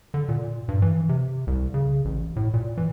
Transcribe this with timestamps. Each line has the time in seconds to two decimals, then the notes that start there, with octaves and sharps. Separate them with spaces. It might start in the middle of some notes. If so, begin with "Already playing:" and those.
0.14 D3
0.29 A#2
0.68 G2
0.82 E3
1.09 C3
1.47 C2
1.74 C#3
2.05 A1
2.36 A2
2.54 A#2
2.77 E3